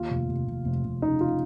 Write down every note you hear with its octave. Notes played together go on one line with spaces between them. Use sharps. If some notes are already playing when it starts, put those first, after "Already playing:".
Already playing: D#2 F4
F1
F1
F1
F1
F1
C#3 D#4
F4